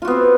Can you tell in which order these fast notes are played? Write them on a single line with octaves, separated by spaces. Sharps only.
F4 F#4 B3 C4